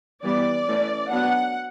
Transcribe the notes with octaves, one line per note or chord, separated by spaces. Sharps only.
E3 G3 B3 D5
E3 A3 C#4
F#3 B3 D4 F#5